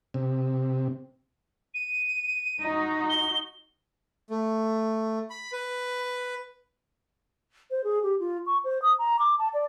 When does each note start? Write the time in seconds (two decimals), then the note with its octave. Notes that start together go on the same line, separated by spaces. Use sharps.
0.14 C3
1.74 D#7
2.60 D#4 F#4
3.09 G7
4.30 A3
5.30 B5
5.53 B4
7.71 C5
7.84 G#4
8.03 G4
8.20 F4
8.46 C#6
8.64 C5
8.82 D#6
8.98 A#5
9.19 D6
9.39 A5
9.54 D5